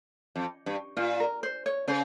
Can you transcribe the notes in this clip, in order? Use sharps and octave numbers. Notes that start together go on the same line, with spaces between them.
F2
G2
A#2 F4
A#4
C5
C#5
C#3 C5